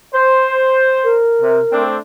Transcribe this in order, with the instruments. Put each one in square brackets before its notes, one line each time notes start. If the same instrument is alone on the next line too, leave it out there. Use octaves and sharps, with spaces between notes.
[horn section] C5
[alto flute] A#4
[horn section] C3
A3 C4 D4